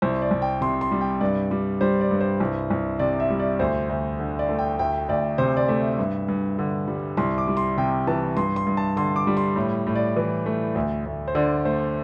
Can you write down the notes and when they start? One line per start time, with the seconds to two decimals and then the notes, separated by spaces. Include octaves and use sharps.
0.02 C2 C5
0.22 D5
0.31 C2
0.42 G5
0.61 C3 C6
0.81 C6
0.91 G3
1.01 G5
1.21 G2 D5
1.51 G3
1.81 G3 C5
2.01 D5
2.11 G2
2.21 C5
2.40 C2
2.70 C2
2.99 C3 D5
3.20 E5
3.30 G3
3.40 D5
3.59 D2 C5
3.89 D2
4.19 D3
4.39 D5
4.49 A3
4.59 G5
4.79 D2 G5
5.08 D2 D5
5.38 C3 C5
5.57 D5
5.68 A3 E5
5.98 G2
6.28 G2
6.59 D3
6.87 G3
7.17 C2 C6
7.38 D6
7.48 G3
7.57 C6
7.77 C3 G5
8.07 E3 A5
8.37 G2 C6
8.56 C6
8.67 G2
8.77 A5
8.97 D3 C6
9.16 D6
9.27 G3
9.37 C6
9.56 A2
9.87 A2
9.95 D5
10.16 E3
10.46 A3
10.75 D2
11.05 D2
11.28 C5
11.35 D3 D5
11.65 A3 C5